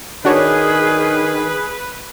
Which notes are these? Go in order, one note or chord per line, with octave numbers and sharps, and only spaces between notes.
D#3 D4 F#4 G#4 B4 C#5